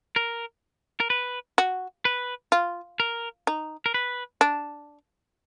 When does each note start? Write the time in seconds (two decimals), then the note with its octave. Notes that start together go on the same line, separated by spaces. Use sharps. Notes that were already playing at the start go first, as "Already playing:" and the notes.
0.16 A#4
1.00 A#4
1.10 B4
1.58 F#4
2.05 B4
2.52 F4
3.00 A#4
3.47 D#4
3.86 A#4
3.94 B4
4.41 D4